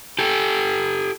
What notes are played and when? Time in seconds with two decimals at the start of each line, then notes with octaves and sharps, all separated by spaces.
0.19 G4 A4